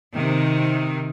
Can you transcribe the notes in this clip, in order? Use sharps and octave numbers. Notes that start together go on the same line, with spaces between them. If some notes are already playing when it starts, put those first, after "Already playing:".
C3 D#3